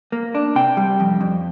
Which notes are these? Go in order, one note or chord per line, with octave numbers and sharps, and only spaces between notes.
A#3
D4
C3 G5
G3
F2
F2